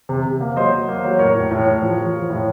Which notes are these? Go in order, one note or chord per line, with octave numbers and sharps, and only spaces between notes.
C3
C3
A#3
F#3 C5 D#5
F#3
A#3
F#3
A2 A#4 C#5
A2
A2
A2
F3
F3
F3
A2